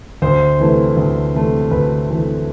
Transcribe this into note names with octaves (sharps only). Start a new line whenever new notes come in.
D2 C5
C3 E3 A3
D2
C3 E3 A3
D2 B4
C3 E3 A3